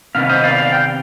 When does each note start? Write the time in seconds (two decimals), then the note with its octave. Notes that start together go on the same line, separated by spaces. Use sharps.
0.15 C3 D#3 B3 F5
0.29 C5 D#5
0.44 D5 F5
0.58 D5 F5
0.72 G5